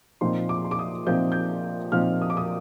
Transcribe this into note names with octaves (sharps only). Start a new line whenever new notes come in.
A#2 F3 C4 D#4 C6
D6
C6
D6
D#6
A#2 F3 C4 D#4 G6
G6
A#2 F3 C4 D#4 F6
D#6
D6
D#6